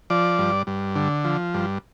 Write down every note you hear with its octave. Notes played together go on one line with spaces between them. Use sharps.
F3 D5
G2
G2
D3
F3
G2